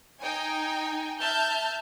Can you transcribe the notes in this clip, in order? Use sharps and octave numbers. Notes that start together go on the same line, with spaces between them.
D#4 G5 G#5
E5 A5 F6 G6